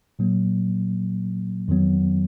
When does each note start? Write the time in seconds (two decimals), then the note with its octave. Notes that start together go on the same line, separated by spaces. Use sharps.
0.19 A#2 F#3 A#3
1.68 F2 D#3 F#3 B3